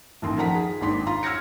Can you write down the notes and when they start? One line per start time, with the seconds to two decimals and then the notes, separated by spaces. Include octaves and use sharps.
0.22 A1 D#2 C6
0.37 D#3 F3 A#4 F#5 A#5 B6
0.55 G#4
0.81 G#1 D#2 D4 C6 B6
1.07 F4 A#5 C6
1.23 E6 F6 G#6 A#6 C#7